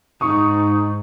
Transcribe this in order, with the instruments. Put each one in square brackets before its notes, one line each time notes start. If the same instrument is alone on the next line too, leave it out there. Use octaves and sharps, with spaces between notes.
[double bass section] G#2 [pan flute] D#4 [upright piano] C#6 D#6